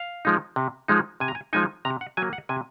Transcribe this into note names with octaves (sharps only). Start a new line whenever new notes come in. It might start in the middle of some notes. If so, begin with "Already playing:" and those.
Already playing: F5
F3 G#3 D#4
C3
F3 G#3 D#4
C3 G#5
A#5
G#5
F3 G#3 D#4 G#5
C3 A#5
F#5
F#3 A#3 G#5
F#5
C3 G#5